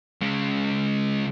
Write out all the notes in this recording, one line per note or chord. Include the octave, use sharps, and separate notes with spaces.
C#3 G#3